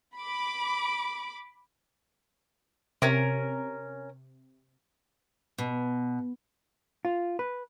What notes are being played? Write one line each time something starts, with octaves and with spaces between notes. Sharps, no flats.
B5 D6
C3 C#4 A#4
B2
F4
B4